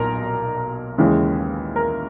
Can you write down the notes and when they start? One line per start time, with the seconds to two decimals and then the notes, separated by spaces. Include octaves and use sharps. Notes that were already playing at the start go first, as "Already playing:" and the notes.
Already playing: B1 A#2 A#4 A#5
0.98 D#2 C#3 E3 G#3
1.76 A#4 A#5